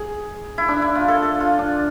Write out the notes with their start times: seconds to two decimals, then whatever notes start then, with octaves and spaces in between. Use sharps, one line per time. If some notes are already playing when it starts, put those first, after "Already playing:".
Already playing: G#4
0.58 E4
0.68 D4
0.82 E4
0.95 F4
1.08 A4
1.22 A4
1.40 F4
1.59 D4